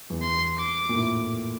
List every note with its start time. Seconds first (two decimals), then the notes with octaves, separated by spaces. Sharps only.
0.10 E2
0.22 C6
0.58 D6
0.89 A#2
0.94 A2